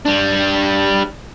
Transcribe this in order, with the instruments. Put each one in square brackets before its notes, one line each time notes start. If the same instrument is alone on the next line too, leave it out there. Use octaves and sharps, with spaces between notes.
[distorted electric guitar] G3 D4